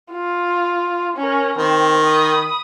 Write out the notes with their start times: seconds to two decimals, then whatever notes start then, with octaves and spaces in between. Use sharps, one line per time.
0.12 F4
1.17 C#4 A#4
1.58 D#3 C4
2.04 B5 D#6